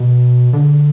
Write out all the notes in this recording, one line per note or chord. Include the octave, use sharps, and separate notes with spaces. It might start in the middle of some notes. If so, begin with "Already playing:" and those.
Already playing: B2
D3